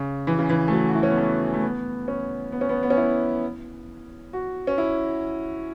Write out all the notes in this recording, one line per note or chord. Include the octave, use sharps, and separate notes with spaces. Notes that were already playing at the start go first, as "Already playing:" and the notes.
Already playing: C#3
E3
C#3
E3
A3
F#3
F#4
E4
C#4
B3
A3
A3
B3
C#4
B3
C#4
B3
B3
C#4
E4
F#4
C#4
E4